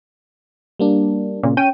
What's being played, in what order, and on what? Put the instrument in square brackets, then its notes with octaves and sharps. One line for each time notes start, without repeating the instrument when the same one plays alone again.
[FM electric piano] G3 A#3 D4
[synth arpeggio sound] A#2 C#3
C#4 G5 D#7